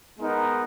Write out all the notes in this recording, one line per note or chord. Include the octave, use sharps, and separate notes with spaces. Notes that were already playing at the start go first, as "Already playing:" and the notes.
G#3 B3 D#4 A#4